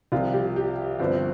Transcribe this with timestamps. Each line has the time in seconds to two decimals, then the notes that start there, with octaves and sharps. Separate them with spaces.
0.12 C2 C3 F3 F4
0.33 G4
0.56 G4
0.99 G1 G2 F3 C4